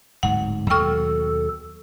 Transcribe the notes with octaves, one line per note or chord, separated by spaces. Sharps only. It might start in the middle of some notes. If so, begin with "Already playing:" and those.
D1 G#2 F#5
D#2 B2 F#3 A4 G5 C#6 F6